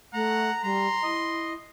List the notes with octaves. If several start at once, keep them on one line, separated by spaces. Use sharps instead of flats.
A3 F#5 A#5
G3 A#5 C6
E4 D#5